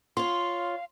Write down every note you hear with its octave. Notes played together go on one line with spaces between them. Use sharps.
F4 C#5 F5 C6